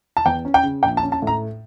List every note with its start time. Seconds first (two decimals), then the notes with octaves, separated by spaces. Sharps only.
0.17 A5
0.25 E2 G5
0.45 C#4
0.54 G5
0.63 C#3
0.83 A#1 G5
0.97 A5
1.02 C#4
1.12 A5
1.22 A2 A#5